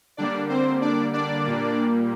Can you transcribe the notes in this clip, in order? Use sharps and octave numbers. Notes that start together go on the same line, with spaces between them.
D3 G3 A#3 D4 D5
C4 C5
D4 D5
D4 D5
A#2 G3 A#3